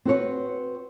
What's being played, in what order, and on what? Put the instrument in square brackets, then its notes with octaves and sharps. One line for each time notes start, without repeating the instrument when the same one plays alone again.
[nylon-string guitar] C4 F#4 B4 C#5